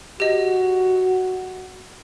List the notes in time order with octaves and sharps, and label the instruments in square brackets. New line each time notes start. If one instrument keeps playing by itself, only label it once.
[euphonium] F#4 [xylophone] G4 D#5